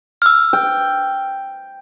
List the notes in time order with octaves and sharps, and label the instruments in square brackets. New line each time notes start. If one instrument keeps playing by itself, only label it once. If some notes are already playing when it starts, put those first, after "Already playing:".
[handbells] E6 F6
[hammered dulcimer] G5